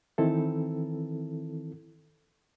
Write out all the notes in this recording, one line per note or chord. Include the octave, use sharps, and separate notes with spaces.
D#3 E3 C4 E4 A4